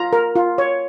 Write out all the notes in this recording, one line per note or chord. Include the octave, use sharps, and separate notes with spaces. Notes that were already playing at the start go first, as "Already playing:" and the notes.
Already playing: F4 A#5
A#4
F4
C#5